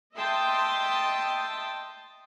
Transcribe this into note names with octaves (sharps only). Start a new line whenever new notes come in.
D#5 E5 G5 A5 C6